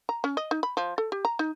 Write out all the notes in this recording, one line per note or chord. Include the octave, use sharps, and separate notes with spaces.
A#5
C#4
D#5
D#4
B5
F3
A4
G4
A#5
D#4